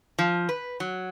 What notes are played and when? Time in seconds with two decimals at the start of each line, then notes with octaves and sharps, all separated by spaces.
0.19 F3
0.49 B4
0.80 F#3